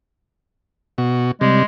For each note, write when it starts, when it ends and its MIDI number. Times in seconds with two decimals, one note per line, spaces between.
0.98 1.31 47
0.98 1.31 66
1.41 1.63 48
1.41 1.63 55
1.41 1.65 56